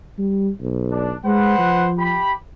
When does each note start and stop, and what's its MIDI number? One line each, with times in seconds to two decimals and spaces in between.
0.18 0.50 55
0.61 1.14 35
0.91 1.13 62
1.25 1.57 56
1.25 1.89 71
1.25 1.89 72
1.25 1.89 78
1.59 2.19 53
1.98 2.32 67
1.98 2.32 83